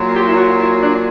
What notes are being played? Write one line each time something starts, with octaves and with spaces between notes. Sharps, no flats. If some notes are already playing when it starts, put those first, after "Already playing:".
Already playing: A#2 F#3
G4
E4
F#4
E4
D4